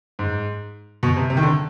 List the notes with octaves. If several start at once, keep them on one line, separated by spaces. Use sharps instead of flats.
G#2
B2
C3
C3
D#3
D3